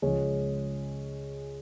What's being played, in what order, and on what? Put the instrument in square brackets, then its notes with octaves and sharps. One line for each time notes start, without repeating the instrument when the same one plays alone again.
[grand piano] C#2 C#3 F3 G#3 C#4